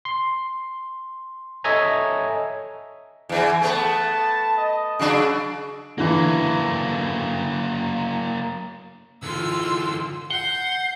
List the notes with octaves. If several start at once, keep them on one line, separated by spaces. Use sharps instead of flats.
C6
A4 C#5 D#5 E5 G#5 A#5
E2 E3
A3 B3 A5
D#5
C#3 F#3 D4
D3 E3 F#3 A#3
D3 E3 F4 C6 E6
F#5 G6 C7 G7